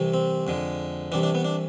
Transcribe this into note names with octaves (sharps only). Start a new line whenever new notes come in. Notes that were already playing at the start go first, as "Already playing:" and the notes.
Already playing: C2 C3 E3
C4
F2 D3 G#3
C2 C3 E3 D4
D4
B3
D4